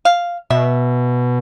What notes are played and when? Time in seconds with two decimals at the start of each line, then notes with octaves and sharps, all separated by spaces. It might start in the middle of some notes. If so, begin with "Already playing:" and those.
0.05 F5
0.50 B2 E5